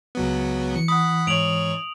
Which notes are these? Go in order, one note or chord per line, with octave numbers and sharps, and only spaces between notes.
C#2 F#3 B3
E3 C#7
F#5 B5 D#6
G#2 C#5 D7 F7 F#7